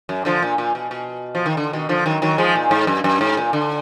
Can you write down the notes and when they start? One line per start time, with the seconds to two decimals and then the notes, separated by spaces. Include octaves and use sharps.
0.09 F#2
0.25 D3 F3
0.42 A#2
0.58 A#2
0.75 B2
0.91 B2
1.35 F3
1.46 D#3
1.57 D3
1.73 B2 D#3
1.89 D3 F3
2.06 D#3 F#3
2.22 D#3 F#3
2.38 F3 G#3
2.55 A#2
2.71 G#2
2.87 F#2
3.04 F#2
3.21 G#2
3.37 A#2
3.53 D3